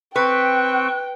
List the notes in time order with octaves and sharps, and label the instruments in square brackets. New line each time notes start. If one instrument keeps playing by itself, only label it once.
[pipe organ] C4 C#6 [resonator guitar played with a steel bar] B4 [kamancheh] G5 [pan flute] F#6